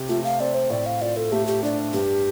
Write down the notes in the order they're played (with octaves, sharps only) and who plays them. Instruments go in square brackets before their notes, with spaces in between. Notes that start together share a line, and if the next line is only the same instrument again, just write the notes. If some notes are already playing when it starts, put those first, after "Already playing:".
Already playing: [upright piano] C3 G4
[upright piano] A3 [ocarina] F4
[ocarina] F5
[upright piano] C4 [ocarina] D5
[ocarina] C5
[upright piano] A2 [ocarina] D5
[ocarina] F5
[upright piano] F4 [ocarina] D5
[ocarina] A4
[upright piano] A3 [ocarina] G4
[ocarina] G4
[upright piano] D4 [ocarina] D5
[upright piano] G2 [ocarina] G4